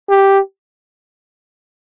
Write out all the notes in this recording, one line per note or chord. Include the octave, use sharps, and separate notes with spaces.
G4